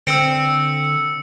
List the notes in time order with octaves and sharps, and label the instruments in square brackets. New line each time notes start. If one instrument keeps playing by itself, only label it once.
[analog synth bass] D3 [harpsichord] C4 [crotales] E6 C#7